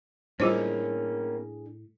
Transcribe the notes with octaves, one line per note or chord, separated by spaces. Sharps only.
A2 G3 A#3 C#4 D4 F4 G#4 C5